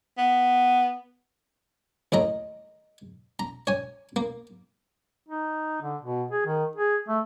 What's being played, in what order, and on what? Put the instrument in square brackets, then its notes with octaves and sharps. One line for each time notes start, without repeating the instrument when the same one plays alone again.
[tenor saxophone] B3
[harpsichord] D#2 A2 D#5 A#5
A#5
C#5 G#5
A#3
[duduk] D#4
D3
B2
G#4
D#3
G#4
A3